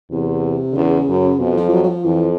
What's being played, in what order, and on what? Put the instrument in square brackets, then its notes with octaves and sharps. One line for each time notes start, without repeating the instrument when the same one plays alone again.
[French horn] E2 [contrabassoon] C3
[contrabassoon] D3
[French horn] E2 [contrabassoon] C#3
[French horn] F#2
[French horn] F2 [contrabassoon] B2
[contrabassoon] F3
F3
F#3
F#3
F3
[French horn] F2 [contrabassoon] E3